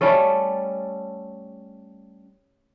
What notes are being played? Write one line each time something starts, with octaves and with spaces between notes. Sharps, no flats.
G3 A3 C#4 A4